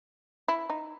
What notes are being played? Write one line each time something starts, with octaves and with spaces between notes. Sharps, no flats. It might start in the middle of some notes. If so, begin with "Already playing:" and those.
E4
D#4